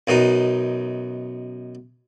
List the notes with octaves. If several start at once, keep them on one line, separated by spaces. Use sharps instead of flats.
F#2 B2 D#4